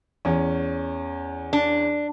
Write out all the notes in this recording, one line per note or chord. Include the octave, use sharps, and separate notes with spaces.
E2 C#4
D4